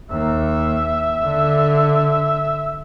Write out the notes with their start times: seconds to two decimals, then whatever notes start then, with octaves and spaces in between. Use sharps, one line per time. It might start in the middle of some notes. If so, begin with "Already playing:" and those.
0.11 D#2 E5
1.23 D3